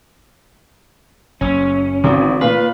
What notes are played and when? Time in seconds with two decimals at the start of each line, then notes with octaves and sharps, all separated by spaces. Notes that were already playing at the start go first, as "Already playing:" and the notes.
1.41 F#1 C#4
2.04 G#1 D3 E3 C4
2.41 A#2 B4 F5